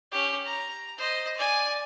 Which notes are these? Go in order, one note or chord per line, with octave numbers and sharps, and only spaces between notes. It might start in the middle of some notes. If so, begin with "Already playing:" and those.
C#4 G4
A#5
C5 D#5
D5 G#5